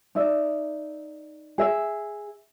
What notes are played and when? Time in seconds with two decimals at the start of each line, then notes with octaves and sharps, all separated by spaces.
0.15 D#4 D5 E5
1.58 G#4 E5